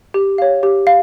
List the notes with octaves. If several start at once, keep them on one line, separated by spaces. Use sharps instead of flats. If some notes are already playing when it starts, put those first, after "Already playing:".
G4
C#5 F5
G4
F5